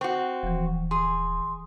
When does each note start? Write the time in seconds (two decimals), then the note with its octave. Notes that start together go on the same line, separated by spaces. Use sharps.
0.01 C4 F#4 C#6
0.43 D#1 E3 F3
0.91 G#4 C6